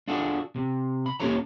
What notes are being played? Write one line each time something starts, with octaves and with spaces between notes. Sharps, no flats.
D4 F4 F#4 G#4 A4
C3
B5
A#3 C#4 G4 A4 C#5 A#5